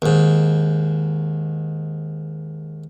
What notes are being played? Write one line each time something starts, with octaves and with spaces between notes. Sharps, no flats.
D#2 G#2